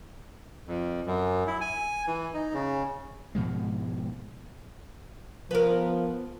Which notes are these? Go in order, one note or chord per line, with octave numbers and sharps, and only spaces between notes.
F2
F#2
E4
G#5
E3
D#4
C#3
G#2 B2 F3 G#3
F3 B3 A#4